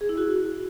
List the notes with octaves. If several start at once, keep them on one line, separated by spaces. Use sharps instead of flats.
G#4
E4
F#4